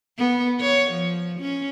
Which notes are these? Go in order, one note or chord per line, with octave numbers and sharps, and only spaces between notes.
B3
C#5
F3
C#4